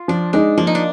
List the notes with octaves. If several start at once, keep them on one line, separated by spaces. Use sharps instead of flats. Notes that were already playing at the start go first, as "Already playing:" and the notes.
Already playing: F4
F3 D4
G#3 D4 D#4
F3 A#3
D#4
D4